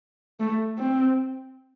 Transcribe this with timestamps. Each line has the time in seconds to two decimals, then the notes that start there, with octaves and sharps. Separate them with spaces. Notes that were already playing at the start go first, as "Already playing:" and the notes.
0.40 A3
0.78 C4